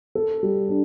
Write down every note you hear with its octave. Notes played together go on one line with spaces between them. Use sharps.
A4
G3
D4